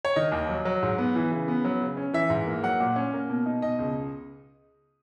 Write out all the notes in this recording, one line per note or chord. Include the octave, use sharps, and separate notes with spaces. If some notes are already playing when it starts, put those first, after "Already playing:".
C#5
D#3 D#5
D#2
F#3
F#3
G#2
B3
E3
C#3
B3
F#3
C#3
C#4
E3 E5
G#2
A#3
F#3 F#5
A#2
C#4
A#3
B2
D#4
B2 D#5
C#2